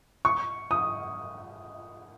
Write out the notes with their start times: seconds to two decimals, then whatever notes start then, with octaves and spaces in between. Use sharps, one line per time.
0.25 C#6
0.71 D#6